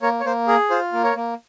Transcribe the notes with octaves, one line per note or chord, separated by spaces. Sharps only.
A#3 A#4 C#5
C#5
A#3 C5
G#4 A#4
F4 C5
A#3
A#4 C#5
A#3